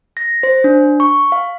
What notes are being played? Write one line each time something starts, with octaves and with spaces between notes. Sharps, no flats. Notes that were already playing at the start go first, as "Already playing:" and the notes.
A#6
C5
D4
C#6
F5